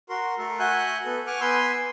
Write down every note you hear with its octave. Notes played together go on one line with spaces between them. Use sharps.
F#4 A#4 C6
A3 A4 A#4
F#4 E5 F#5 G#5 F#6 G6
B3 A4
F#5 G#5 C#6 D6 F6 F#6
B3 B4 G#5 C6 E6 G6